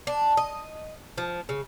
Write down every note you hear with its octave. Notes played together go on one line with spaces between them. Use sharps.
D4
D#5
F3
C#3